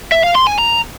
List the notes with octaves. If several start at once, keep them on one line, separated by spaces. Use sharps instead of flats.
E5
F5
C6
G#5
A#5